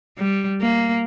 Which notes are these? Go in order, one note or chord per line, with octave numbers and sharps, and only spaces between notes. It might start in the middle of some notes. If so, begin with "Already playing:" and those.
G3
A#3